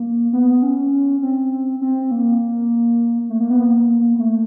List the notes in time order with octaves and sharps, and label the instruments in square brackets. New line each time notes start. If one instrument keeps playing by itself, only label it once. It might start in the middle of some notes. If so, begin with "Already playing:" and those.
Already playing: [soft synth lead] A#3
B3
C#4
C4
C4
A#3
A3
A#3
B3
A#3
A3